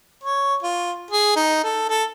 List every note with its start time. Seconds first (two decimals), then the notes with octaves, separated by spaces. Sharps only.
0.24 C#5
0.63 F4
1.11 G#4
1.36 D#4
1.64 A4
1.90 A4